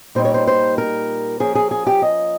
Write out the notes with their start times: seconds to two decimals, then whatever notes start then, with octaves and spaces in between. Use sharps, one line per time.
0.15 A#2 G3 A#3 D#4 C5
0.25 C#5
0.34 C5
0.47 C5
0.78 A#4
1.40 F3 A#3 C#4 G#4
1.55 G#4
1.71 G#4
1.87 G4
2.02 D#5